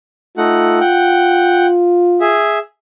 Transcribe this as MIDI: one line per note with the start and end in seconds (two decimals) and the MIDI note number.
0.38 0.80 57
0.38 0.80 63
0.38 2.44 65
0.38 0.80 78
0.81 1.67 78
0.81 1.67 79
2.20 2.58 68
2.20 2.58 76